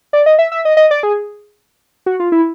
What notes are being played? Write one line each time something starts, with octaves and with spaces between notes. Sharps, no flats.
D5
D#5
E5
E5
D#5
D#5
D5
G#4
F#4
F4
E4